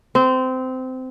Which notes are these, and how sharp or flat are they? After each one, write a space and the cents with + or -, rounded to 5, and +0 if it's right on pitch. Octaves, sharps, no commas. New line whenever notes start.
C4 -20